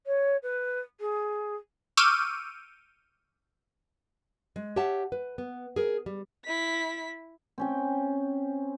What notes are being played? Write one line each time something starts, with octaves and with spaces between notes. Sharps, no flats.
C#5
B4
G#4
C#6 D6 E6 F6 G6 D#7
G#3
G4 C#5 E5 F#5 A5
B4
B3
G#4 A#4
G3
E4 B6
C4 C#4 G5